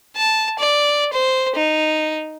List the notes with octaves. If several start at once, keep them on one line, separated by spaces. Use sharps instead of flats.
A5
D5
C5
D#4